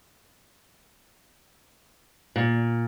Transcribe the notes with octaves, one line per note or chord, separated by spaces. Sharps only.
A#2